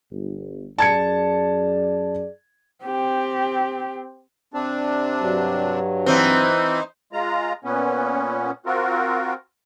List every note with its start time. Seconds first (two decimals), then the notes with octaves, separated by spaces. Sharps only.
0.11 G1
0.78 F#2 G#4 D5 A5 G#6 C#7
2.85 C4 G4
4.54 C3 C4 D4
5.23 G2 F#3
6.06 E3 C4 D#4 C5
7.13 G#3 F4 A#5
7.64 A#2 B3 C#4
8.66 C4 F4 F#4 A#4